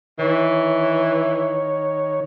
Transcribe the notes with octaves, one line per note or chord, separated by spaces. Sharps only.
D#3 E3 C#5